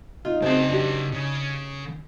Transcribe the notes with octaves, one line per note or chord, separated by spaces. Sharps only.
D#4 F4
C#3 C4 F#4 G#4 G5 A5
D4 G4
C#3